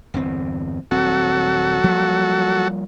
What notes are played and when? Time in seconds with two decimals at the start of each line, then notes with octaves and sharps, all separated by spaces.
0.14 G1 E2 C4
0.91 D#1 F#3 C4 F#4 A4
1.84 F3 G3 A#3